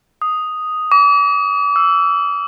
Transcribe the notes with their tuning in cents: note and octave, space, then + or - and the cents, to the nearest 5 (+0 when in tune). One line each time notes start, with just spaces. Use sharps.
D#6 +0
D6 -40
E6 +5